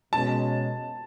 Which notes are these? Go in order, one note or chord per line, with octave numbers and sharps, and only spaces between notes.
B2 G#3 C#4 A5